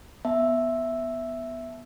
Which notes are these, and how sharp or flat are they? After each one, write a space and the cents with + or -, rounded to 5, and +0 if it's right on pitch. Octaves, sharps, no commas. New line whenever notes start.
B3 +0 E5 +0 A5 -15